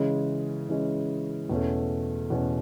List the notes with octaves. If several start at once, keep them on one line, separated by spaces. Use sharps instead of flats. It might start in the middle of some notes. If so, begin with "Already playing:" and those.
Already playing: C#3 E3 G#3 C#4
C#3 E3 G#3 C#4
E2 B2 A3 C#4
E2 B2 A3 C#4